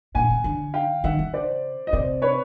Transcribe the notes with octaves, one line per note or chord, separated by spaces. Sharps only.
A#2 F#5 G#5
C#3
D3
F5 G5
D#3 E5 F#5
C#3
C5 D5
D#5
C3 C5 D5
B4 C#5